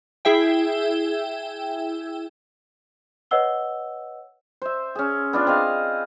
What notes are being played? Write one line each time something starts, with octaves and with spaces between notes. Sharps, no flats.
E4 G#4 E5 G5
B4 C#5 D#5 F#5 E6 G7
C5 E5
C#4 G#4
B3 D4 F4
C4 G#4 D#5 F5